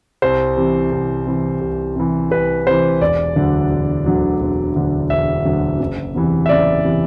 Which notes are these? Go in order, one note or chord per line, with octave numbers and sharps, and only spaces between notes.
C2 C5
C3 E3
C2
C3 E3
C2
C3 E3
C2 B4
C3 E3 C5
E1 D5
D2 D3 F#3
E1
D2 D3 F#3
E1
D2 D3 F#3
E1 E5
D2 D3 F#3
F#1
E2 C3 E3
E5
F#1 D5
C3 E3